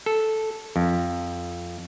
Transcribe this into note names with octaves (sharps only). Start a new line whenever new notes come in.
A4
F2